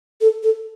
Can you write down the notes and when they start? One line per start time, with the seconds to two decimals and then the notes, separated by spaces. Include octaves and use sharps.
0.21 A4
0.43 A4